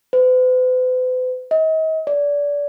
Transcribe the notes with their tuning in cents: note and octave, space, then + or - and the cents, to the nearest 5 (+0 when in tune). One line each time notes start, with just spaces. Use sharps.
B4 +45
D#5 +40
D5 -25